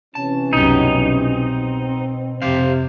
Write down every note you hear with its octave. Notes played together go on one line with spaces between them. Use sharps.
C3 E3 C#4 A5
C2 F#2 B2 D#4 G4
C4
F2 C3 G4 C5 F5